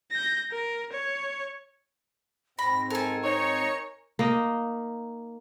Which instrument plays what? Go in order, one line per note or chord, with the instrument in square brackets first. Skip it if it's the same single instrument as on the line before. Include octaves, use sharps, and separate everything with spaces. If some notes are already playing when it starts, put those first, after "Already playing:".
[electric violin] G6 A#6
A#4
C#5
[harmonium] G#2 C4 [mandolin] B5 [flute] A#6
[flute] A4 [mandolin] A#4 G#5
[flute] D#4 [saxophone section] C#5
[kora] A#3 D#4 D#5